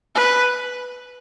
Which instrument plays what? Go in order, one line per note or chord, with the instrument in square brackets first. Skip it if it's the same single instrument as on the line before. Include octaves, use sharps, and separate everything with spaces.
[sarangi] B4